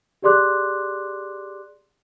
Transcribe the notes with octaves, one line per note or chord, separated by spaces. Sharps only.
G4 G#4 D5 C6 D6 F#6